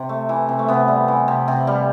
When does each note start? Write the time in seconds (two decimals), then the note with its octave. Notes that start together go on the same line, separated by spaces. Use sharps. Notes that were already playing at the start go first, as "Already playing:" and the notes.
Already playing: C3
0.09 A3
0.29 E3
0.49 C3
0.59 A3
0.68 C3 B3
0.88 G3
1.08 E3
1.28 C3
1.48 C3
1.67 G3